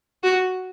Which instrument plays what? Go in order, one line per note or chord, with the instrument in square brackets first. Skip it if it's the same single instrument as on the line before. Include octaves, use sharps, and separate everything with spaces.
[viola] F#4